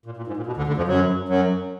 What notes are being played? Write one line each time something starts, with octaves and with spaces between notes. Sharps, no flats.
A#2
A#2
G#2
A#2
B2
D2 D3
D2 D3
F2 F3
F#2 F#3
F#2 F#3